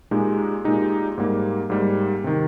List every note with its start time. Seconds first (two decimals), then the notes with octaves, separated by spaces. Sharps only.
0.11 A#2 G#3 D#4 G4
0.64 A#2 G#3 D#4 G4
1.18 G#2 G3 A#3
1.70 G#2 G3 A#3
2.24 C3 D#3